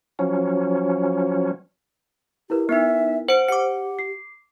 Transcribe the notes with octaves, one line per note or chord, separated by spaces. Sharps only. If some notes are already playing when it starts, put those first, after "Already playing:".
F3 F#3 C#4
E4 G4 A#4 B4
B3 D#4 E5
C5 F#5 D7
G4 F#5 D6 C#7
C7